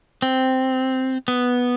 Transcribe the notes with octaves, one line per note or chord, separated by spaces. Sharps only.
C4
B3